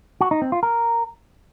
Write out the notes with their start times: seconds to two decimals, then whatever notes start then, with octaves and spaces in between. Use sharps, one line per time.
0.21 F#4
0.31 D#4
0.42 C4
0.52 F4
0.63 A#4